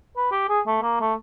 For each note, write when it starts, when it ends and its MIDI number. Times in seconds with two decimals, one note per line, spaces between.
0.17 0.30 71
0.32 0.49 67
0.49 0.61 68
0.67 0.81 57
0.82 0.97 58
1.01 1.14 57